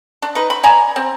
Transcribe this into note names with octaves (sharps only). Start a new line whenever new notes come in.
D4
D#4 B4
B5
D5 G#5 A#5 B5
C4